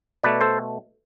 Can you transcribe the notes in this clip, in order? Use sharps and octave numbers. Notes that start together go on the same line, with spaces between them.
B2 A3 B4 D5
A4 C5